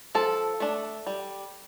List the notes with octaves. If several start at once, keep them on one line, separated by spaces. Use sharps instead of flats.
F3 A4
A3 D4
G3